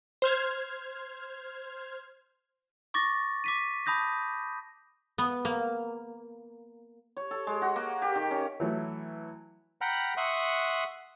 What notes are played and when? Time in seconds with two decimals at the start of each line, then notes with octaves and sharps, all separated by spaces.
0.22 C5 F6 G#6
2.94 C#6 D6 A6 A#6
3.44 D6 B6 D#7
3.86 A5 B5 D#6 G6 A#6
5.18 B3
5.45 A#3
7.17 C#5
7.31 A4
7.47 G#3
7.62 F#4
7.76 A#3
8.02 G4
8.15 D#3
8.31 C#4
8.60 E3 F#3 A3
9.81 F#5 G5 A#5 B5 F6 F#6
10.17 E5 F#5 C6 C#6 D#6 F#6